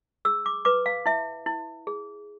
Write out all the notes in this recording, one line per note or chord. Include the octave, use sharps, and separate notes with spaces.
G#4 E6
D6
B4 D6
F5
E4 E5
E4
G#4